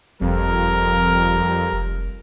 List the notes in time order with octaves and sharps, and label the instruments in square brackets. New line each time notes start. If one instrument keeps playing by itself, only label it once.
[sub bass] F#1 [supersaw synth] F2 [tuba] G3 [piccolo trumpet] A#4
[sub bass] F1